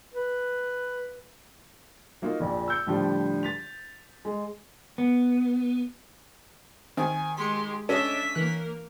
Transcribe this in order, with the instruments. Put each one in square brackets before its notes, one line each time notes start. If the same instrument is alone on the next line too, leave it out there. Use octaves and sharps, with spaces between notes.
[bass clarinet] B4
[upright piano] F#3 A#3 D#4 F4
A#1 F2 A#2
E6 G6 C#7
A2 D3 F3 G3 D4 G4
A6 B6 F7
G#3
[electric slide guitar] B3
[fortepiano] D#3 [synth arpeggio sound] C4 [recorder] G#5
[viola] G#3 G4 [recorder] C6 [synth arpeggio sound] B6 C#7
[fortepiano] C#4 [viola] D4 E5 [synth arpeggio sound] A4 D#5 [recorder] B6
[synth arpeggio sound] E3 F#6 [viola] A#3 A#4